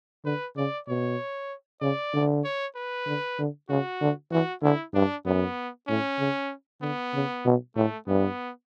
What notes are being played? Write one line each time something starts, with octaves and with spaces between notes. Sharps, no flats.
D3 B4
C#3 D5
B2 C#5
C#3 D5
D3
C#5
B4
D3
D3
C#3 F#4
D3
E3 F#4
D3 E4
G2 D4
F#2 B3
A2 C#4
C#3
D3 B3
C#3
B2
A2 A3
G2 B3